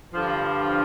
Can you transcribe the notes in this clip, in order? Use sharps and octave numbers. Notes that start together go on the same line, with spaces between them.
G2 D3 F3